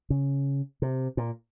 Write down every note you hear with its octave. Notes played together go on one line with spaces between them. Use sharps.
C#3
C3
A#2